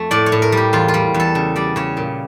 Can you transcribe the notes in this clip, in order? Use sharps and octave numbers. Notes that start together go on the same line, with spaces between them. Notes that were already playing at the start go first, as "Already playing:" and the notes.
Already playing: F2 A3
A2 D5
C#5
A2
A#4
G3 G4
E2 F4
F4
G3
E2
A4
C#3
G3 D5
C#3 C#5
A#2